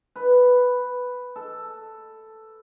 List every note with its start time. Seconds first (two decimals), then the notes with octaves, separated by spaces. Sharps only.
0.16 B4
1.36 A4